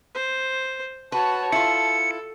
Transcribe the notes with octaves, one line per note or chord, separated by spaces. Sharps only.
C5
F#4 B4 C#5 A5
E4 F4 A4 C#7